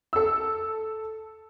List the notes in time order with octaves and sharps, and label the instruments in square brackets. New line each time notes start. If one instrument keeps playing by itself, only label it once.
[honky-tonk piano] A4 E6